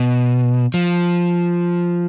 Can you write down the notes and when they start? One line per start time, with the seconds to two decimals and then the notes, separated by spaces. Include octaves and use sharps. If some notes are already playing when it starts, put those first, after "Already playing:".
Already playing: B2
0.74 F3